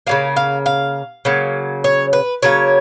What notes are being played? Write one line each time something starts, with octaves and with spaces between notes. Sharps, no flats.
C#3 F#3 A#3 F5
F5
F5
C#3 F#3 A#3
C#5
B4
C#3 F#3 A#3 C#5